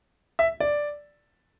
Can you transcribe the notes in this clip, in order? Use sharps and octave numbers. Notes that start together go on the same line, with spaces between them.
E5
D5